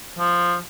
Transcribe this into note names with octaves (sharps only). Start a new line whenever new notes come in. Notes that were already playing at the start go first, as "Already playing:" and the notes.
F3